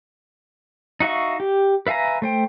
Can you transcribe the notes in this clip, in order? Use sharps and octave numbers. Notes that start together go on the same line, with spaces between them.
D#4 F#4 E5 F5 C#6
G4
B4 E5 F5 G#5 A#5
A3 C5 G5